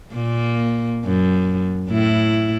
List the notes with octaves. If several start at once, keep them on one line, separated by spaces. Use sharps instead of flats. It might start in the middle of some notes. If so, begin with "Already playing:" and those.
A#2 A#3
F#2
A2 E4